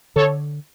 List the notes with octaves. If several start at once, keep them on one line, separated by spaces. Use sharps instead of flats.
D3 A4 C#5